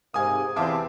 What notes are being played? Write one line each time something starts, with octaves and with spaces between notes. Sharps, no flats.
G#2 C3 A#3 G#5 D#6
E2 C3 C4 F4 E5 A5 D6